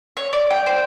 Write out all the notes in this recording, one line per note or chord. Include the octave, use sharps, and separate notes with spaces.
C#5
D5
G5
C5